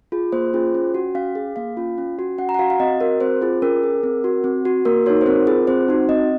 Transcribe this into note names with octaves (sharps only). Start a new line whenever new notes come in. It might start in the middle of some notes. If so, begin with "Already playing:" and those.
F4 G#4
A#3 C5
C#4 F4 G#4
C#4
F#4
C#4 F5
G#4
A#3 F5
C#4 F4
C#4
F#4
C#4 F#5
A#5
F#5
F#4 F5
F5
C4 D#5
F#4 A#4
C4 C5
F4 G#4
C#4 A#4
G#4
C4
F#4
C4
F#4
A#3 A#4
D#4 F#4 C#5
C5
C4 A#4
F4 G#4
C4 C5
D#4 F#4
C4 D#5